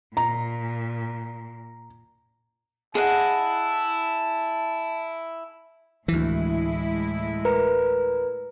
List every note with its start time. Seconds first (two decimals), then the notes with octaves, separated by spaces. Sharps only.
0.17 A#2 A#5
2.95 E4 G#4 D#5 F#5 A5
6.08 D2 A2 E3 G#3 E4
7.45 A#4 B4 A#5